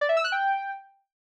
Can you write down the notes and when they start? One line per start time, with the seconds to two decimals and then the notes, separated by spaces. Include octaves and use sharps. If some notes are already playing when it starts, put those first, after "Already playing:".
0.01 D5
0.09 E5
0.17 E6
0.24 F#6
0.32 G5